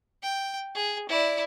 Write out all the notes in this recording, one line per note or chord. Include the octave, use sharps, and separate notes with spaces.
G5
G#4
E4 D5